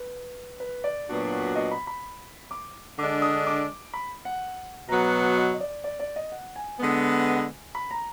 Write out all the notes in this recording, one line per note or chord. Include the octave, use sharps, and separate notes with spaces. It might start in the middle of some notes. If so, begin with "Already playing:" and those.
Already playing: B4
B4
D5
A#2 F#3 B3 D4 F#4
D#5
B5
B5
D6
D3 G#3 D4 D6
D#6
D6
B5
F#5
B2 F#3 B3 A#5
D#5
D#5
D5
D5
D5
D#5
F#5
G#5
D3 G#3 B3
B5
A#5